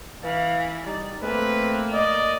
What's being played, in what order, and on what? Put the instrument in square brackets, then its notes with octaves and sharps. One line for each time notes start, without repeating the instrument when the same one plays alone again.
[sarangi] E3 [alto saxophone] B4 [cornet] F5
[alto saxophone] G3 [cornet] D#4 [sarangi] D5
[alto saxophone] A3 [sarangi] A#3 [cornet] C4 [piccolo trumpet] B4
[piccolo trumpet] D5 [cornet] D#5